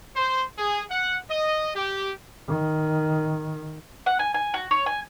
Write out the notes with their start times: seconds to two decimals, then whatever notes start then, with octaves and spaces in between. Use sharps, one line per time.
0.16 C5
0.58 G#4
0.90 F#5
1.30 D#5
1.75 G4
2.48 D#3
4.06 F#5
4.19 G#5
4.34 G#5
4.54 F#4
4.71 C#5
4.86 G#5